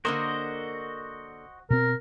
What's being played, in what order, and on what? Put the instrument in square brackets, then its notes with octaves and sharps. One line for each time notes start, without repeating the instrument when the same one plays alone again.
[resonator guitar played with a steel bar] D3 A#3 A#4 [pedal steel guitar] F#4 C5 D#5
[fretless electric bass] B2 C4 [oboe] A#4